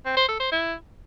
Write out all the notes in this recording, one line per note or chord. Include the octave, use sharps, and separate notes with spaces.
C4
C5
A4
C5
E4